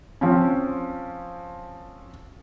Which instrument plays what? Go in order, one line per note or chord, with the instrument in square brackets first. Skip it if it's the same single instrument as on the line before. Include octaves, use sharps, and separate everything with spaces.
[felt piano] F3 C4 C#4